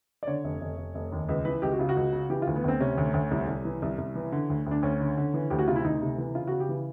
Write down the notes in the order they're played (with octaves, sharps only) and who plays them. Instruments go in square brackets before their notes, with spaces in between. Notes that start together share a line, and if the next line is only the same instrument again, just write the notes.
[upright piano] D5
D3 C#5
F1
F1
F1
F1
D#2
C#2 B4
E3 B4
C#2 G4
F#4
C#3 F4
F#4
C#2
C#3
E3 G4
D2 F4
B3
D2 C4
C3 C#4
D2
D2
C2
C2
E3
C2
C2
E3
D3
D2
D2
D4
D2 C#4
D3
D3
E3
D2 G4
F#4
C3 F4
E4
D2 D#4
C3
E3
C#3 F4
C#3 F#4
G4
E3